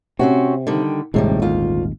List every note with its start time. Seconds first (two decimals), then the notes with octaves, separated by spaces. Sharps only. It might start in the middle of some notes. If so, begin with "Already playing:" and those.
0.19 C3 C4 C#4 F#4
0.67 D3 D#3 G3
1.14 D#1 G#1 A2 C3 G3 G#3
1.42 D2 F4